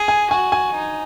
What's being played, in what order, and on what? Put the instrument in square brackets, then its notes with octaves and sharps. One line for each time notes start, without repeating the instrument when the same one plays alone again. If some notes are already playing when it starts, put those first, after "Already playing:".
Already playing: [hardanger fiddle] G#4
[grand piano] G#5
[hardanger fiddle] F#4 [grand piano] G#5
[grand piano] G#5
[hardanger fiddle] D#4